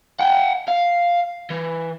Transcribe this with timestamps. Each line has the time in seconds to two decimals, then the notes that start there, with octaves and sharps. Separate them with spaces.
0.19 F#5 G5
0.68 F5
1.50 E3